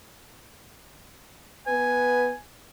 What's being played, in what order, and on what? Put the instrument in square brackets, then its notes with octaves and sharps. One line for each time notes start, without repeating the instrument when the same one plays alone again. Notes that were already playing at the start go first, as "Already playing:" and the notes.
[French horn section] B3 B4 [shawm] G#5